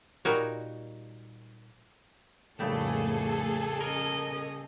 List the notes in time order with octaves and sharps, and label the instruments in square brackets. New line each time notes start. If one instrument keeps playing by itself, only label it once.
[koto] A#2 G3 D#4 F#4 A#4 C#5
[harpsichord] A#1 C#3 G3 [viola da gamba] F2 A2 [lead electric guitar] A3 [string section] G#4 A4
[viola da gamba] C#4 D#5 [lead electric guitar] A#4